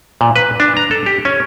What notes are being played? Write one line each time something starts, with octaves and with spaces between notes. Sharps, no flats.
A#2
B4
D4
A#5
A4
G4
C#4